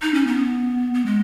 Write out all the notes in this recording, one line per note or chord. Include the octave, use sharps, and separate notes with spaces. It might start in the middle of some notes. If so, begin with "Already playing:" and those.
D#4
C#4
B3
B3
G#3